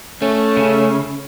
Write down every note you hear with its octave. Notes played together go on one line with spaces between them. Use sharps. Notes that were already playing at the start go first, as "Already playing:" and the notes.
A3 C#4
C#3